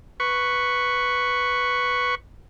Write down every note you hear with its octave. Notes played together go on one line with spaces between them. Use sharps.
B4 C#6